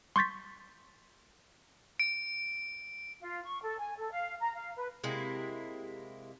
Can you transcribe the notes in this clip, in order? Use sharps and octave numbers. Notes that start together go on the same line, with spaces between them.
C6 C#6 G6 A6 B6
D7
F4
C#6
A4
G#5
A4
F5
A#5
F5
B4
C3 G#3 A#3 E4